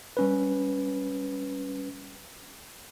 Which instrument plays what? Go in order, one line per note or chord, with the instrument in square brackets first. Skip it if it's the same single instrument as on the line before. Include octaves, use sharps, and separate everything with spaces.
[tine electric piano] G3 C#4 B4